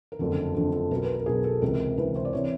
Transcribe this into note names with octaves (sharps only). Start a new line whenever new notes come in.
A#4
F#1 F2 D3 A4
F#1 F2 D3 A4
A4
B1 B2 A#4
B4
A#4
B1 B2 G#4
A4
C#2 C3 E3 A#4
C#2 C3 E3 B4
C5
D5
C3 E3 C#5